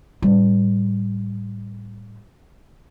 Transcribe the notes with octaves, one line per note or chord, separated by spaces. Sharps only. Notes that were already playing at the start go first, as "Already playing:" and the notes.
A2 G3